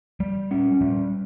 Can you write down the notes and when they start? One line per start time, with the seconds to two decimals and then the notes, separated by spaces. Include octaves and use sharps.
0.20 G3
0.51 C#4
0.81 G3